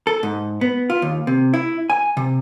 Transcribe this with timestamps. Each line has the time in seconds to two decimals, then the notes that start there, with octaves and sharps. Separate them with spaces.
0.07 A4
0.23 G#2
0.61 B3
0.90 F4
1.02 D#2
1.27 C3
1.54 E4
1.90 G#5
2.17 C3